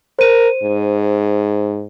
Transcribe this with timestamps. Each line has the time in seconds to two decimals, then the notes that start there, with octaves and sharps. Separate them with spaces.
0.19 A#4 C5 D#7
0.63 G#2